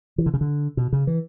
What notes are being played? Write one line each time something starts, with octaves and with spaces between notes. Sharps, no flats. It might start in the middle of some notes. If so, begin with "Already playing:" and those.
E3
D3
C#3
D3
B2
C#3
E3